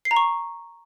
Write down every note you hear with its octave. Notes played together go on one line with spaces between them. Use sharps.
C7
A#5
C#6